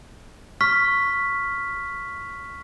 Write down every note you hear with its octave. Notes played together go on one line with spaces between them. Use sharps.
C#6 F6 B6